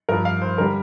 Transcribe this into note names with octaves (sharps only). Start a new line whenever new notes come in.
G2 F3 A#4
F5
C5
D3 G3 A#4